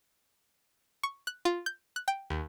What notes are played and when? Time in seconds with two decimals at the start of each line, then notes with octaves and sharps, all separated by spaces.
1.03 C#6
1.27 F#6
1.45 F4
1.66 G6
1.96 F#6
2.08 G5
2.30 D#2